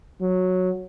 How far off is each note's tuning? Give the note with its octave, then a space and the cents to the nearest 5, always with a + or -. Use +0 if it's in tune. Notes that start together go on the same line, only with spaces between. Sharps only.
F#3 -10